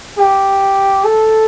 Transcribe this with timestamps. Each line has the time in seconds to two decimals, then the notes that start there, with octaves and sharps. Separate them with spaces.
0.18 G4
1.05 A4